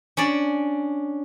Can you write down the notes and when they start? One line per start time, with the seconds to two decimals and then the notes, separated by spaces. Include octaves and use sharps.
0.17 C#4 D4 D5